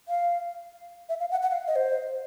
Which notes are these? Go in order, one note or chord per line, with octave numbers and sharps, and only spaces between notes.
F5
E5
F5
F#5
F#5
F5
D#5
C5